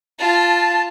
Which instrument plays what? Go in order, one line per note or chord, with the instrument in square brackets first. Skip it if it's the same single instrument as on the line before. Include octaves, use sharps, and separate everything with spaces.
[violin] F4 [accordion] A5